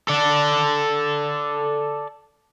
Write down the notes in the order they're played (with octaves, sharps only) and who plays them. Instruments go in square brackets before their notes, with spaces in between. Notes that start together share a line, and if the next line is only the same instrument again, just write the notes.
[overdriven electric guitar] A4 D5